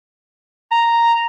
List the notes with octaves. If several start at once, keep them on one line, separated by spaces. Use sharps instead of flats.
A#5